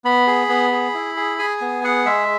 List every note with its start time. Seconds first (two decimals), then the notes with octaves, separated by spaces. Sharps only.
0.05 B3 B5
0.27 G#4
0.49 B3
0.72 G#4
0.94 E4
1.17 G#4
1.39 G#4 G#5
1.61 B3
1.84 G#4 F#5
2.06 G#3 E5